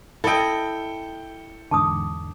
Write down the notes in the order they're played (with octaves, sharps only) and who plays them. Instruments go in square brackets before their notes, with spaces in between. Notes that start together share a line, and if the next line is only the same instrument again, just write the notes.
[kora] E4 D#5 [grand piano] A4 G5
[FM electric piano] E2 G#2 D3 [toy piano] A5 D6 D#6